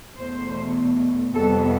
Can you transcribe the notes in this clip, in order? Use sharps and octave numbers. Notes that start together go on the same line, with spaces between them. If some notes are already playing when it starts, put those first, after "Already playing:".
E2 B2 A3 C5
F2 C3 G3 B3 A4